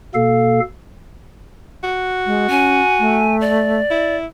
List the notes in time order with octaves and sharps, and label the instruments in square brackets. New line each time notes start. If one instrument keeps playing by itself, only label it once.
[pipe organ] B2 A#3 A4 F5
[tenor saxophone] F#4
[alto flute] G#3
[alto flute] C#4 [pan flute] G#5
[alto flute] A3
[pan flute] D5
[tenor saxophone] E4